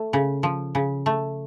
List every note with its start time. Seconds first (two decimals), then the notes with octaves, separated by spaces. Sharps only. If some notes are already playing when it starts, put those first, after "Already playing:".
Already playing: A3
0.13 C#3
0.43 F3
0.75 C#3
1.06 A3